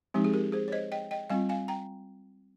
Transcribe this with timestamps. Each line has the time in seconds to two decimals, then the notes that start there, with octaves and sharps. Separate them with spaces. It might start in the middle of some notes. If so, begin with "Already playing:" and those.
0.14 F3 G#3 C4 D#4 G4
0.24 G#4
0.33 G4 A#4
0.52 G#4 C5
0.68 C#5
0.72 C5 D#5
0.92 D#5 G5
1.11 D#5 G5
1.30 G3 C4 F4 F5 G#5
1.49 F5 G#5
1.68 G5 A#5